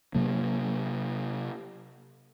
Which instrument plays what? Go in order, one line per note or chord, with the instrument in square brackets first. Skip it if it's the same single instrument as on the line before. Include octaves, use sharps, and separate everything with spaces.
[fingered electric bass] C3 F#3 A#3